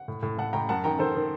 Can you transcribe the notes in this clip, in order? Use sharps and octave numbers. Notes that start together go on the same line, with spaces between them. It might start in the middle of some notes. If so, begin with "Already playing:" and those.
Already playing: F#5
A2
A2
A2 F#5 A5
A2 G5 A#5
F#2 F#5 A5
D#3 G5 A#5
D#3 A4 C5
D#3